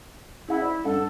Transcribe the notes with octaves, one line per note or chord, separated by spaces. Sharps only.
E4 G#4 F#5
D5
G2 A4 F#5